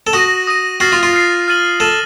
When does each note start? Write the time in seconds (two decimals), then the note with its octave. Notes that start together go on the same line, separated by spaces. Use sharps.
0.07 A4
0.13 F#4 D#6 A#6 D#7
0.47 D#6 A#6 D#7
0.80 F#4 F6 A6 C7
0.92 F4
1.03 F4
1.13 F6 A6 C7
1.48 F6 A6 D#7 F#7
1.80 A4 F6 A6 D#7 F#7